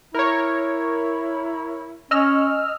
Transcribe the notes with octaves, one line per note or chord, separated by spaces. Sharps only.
E4 A#4 C#5
C#4 D#5 E6 F6